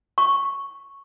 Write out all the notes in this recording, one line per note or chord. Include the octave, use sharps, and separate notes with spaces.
C#6